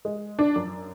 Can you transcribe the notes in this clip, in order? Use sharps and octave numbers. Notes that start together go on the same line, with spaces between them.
G#3
D4
F#2